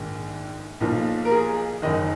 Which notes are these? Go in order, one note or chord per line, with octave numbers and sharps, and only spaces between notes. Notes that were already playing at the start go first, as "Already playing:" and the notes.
Already playing: A#1 G#2 D#3
B1 A#2 F3
A#4
G#4
F#1 F#2 D#3 D#5